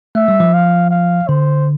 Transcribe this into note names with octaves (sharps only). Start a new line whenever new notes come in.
A3 E5
G3
F3
F5
F5
D3 C5